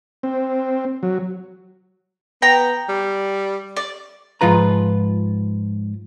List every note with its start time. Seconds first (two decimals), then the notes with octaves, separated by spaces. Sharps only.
0.23 C4
1.03 F#3
2.42 B3 G5 A#5
2.89 G3
3.77 D5
4.41 G#2 F3 F4 B4 A#5